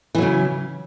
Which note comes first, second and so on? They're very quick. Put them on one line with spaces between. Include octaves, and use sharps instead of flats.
E3 F#3 C#3